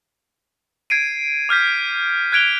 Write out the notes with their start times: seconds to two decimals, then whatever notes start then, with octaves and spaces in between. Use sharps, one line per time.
0.90 G#6 C7 D7 D#7
1.49 D6 F6 G6 B6
2.32 F#6 G#6 D7 F7 G7